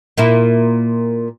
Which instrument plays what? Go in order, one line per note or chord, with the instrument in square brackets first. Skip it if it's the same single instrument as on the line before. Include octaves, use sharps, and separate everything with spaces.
[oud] A#2 A#3 E4